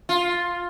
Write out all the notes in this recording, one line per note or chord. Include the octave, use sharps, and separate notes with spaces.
F4